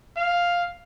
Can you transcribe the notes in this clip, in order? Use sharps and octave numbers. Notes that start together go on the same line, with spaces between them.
F5